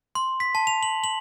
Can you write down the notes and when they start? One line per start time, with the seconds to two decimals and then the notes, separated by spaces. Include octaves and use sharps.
0.15 C6
0.40 B6
0.55 A5
0.67 F7
0.83 F#7
1.04 F#7